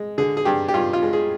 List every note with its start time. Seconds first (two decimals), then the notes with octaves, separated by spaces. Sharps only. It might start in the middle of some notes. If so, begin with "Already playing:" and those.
Already playing: G#3
0.18 D3 G#4
0.37 G#4
0.45 G2 G4
0.68 G4
0.74 G2 F4
0.93 F4
1.03 G#3
1.13 G#4